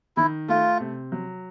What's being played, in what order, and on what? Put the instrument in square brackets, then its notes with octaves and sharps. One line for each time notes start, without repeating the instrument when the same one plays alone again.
[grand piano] D#3 [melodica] E4
[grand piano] A3 [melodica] F4
[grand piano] C3
F#3